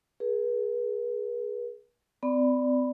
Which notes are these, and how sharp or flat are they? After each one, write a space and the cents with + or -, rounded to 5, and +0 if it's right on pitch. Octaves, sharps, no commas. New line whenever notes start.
G#4 +0 B4 -45
C4 -40 D5 +0 B5 +0